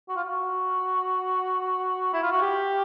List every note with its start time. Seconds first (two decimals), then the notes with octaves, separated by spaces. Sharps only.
0.08 F#4
0.16 F4
0.23 F#4
2.13 E4
2.22 F4
2.32 F#4
2.42 G4